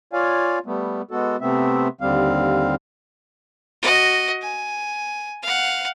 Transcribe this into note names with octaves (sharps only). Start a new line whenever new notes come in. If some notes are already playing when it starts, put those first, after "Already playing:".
F4 C#5 D5 F5 G#5
G3 A3 B3
G#3 B3 F#4 A4
C3 A3 B3 C4 E5
D#2 D3 G3 C4 F5
F#4 D#5
G#5
F5 F#5